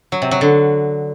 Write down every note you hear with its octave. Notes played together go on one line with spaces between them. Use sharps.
F#3
C3
F#3
D3